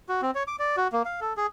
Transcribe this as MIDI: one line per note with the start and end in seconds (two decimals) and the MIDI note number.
0.09 0.21 66
0.22 0.31 60
0.35 0.43 73
0.47 0.56 86
0.59 0.76 74
0.77 0.88 66
0.92 1.02 58
1.05 1.20 77
1.21 1.33 69
1.37 1.47 68